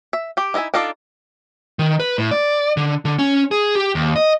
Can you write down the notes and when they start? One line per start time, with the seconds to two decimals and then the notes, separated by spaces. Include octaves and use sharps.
0.13 E5
0.37 G4 G5
0.54 D#4 E4 D#5 E5 G#5
0.74 D4 D#4 F4 A4 D5
1.79 D#3
2.00 B4
2.18 A2
2.31 D5
2.77 D3
3.05 D3
3.19 C#4
3.51 G#4
3.75 G4
3.95 D#2
4.16 D#5